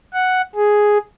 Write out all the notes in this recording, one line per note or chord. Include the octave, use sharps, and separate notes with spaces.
F#5
G#4